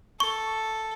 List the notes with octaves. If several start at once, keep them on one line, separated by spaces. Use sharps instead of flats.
A4 C#6